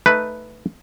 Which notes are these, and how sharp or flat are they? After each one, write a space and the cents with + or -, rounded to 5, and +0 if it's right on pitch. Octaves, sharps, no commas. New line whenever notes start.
A3 +0 D#4 +0 B4 +0